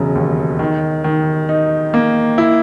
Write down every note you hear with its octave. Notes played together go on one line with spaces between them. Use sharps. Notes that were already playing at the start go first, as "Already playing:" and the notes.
Already playing: E1 C#3 F#3
D#2
D#3
D#3
D#4
A#3
E4